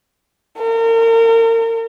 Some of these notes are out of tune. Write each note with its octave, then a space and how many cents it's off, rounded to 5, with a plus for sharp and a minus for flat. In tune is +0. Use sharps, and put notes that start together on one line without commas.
A#4 -35